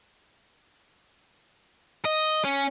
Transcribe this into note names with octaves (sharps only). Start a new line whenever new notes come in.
D#5
C#4